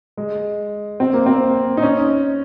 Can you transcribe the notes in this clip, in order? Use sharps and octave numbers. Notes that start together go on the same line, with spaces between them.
G#3
C4
A#3
C4
D#4
C#4